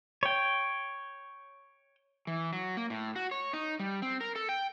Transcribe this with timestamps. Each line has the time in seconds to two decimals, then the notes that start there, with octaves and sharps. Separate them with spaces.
0.23 C#5 G5
2.27 E3
2.53 F#3
2.77 A#3
2.90 A2
3.16 F#4
3.31 C#5
3.53 D#4
3.80 G3
4.02 C4
4.21 A#4
4.36 A4
4.49 G5